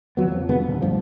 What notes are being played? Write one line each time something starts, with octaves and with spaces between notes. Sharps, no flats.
F#1 F3 F#3 B3
F2 F3
F1 D3 G#3 B3
D#1
D1 B1 G2 F3